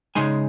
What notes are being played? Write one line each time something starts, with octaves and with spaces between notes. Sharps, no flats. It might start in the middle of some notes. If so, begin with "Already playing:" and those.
C#3 G#3 D#4 G#5 C6